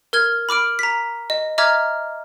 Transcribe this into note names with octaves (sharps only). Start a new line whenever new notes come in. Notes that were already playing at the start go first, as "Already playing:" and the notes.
A#4 F6 G#6
B5 D6 F6 D7
A#5 B6
D#5
D#5 E5 A#5 D6 F6 G#6